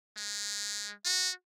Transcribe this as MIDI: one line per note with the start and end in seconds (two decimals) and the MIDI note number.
0.17 0.92 56
1.05 1.30 66